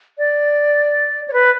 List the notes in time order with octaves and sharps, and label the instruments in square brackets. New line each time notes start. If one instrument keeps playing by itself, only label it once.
[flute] D5
C#5
B4